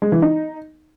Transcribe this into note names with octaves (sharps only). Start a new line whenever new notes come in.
G#3
E3
D#4